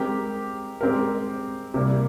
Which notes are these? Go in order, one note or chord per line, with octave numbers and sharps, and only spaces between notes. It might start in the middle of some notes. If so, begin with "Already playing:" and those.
Already playing: G#3 C4 G4 A#4
G#3 C4 G4 A#4
C3 G3 A#3